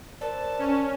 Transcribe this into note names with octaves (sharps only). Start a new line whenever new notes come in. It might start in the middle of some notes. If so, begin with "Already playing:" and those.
A#4 C5 D5 A5
C#4